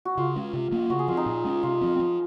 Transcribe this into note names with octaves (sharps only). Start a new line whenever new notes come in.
F#4
C#3 F4
G#3 C#4
C3
F3 A#3 C#4
C#3 F#4
G#4
F3 C4 F4
D#4
A#2
G#3 C#4
C3 F4
F3 C4
F3